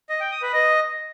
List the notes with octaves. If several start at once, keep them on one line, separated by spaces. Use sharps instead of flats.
D#5
G5
D#6
B4
D#5